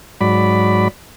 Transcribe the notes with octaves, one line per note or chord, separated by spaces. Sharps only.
G#2 F#3 D5 B5